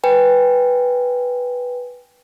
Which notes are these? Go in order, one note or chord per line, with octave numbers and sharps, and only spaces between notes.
B4 G5 G#5